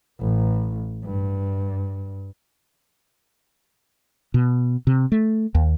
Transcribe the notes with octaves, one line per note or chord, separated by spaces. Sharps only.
A1
G2
B2
C3
A3
D#2